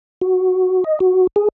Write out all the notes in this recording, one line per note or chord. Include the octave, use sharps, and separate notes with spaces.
F#4
D#5
F#4
G#4